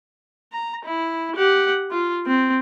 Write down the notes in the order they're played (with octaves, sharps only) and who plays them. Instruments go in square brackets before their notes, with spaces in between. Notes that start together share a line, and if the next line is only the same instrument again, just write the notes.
[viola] A#5
E4
G4 F#5
F4
C4